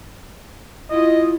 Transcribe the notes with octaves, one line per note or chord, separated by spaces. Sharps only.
E4 F4 D#5